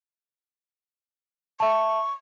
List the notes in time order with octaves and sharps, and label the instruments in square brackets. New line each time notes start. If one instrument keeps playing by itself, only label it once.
[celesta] E5 A5 [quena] C#6